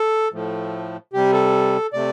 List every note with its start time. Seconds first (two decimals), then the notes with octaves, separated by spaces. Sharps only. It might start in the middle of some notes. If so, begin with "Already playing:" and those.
Already playing: A4
0.33 A2 F3 A3
1.13 C3 G3 G4
1.33 A4
1.93 C3 A3 D5